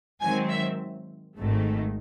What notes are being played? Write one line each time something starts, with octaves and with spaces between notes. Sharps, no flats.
G#2 D#3 F#3 C4 G#5
E5
G#1 G#2 D#3 A3